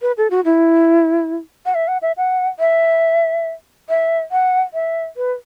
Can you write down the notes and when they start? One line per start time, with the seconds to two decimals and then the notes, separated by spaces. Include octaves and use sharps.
0.02 B4
0.17 A4
0.30 F#4
0.45 E4
1.66 F#5
1.75 E5
1.88 F#5
2.02 E5
2.17 F#5
2.59 E5
3.89 E5
4.32 F#5
4.74 E5
5.17 B4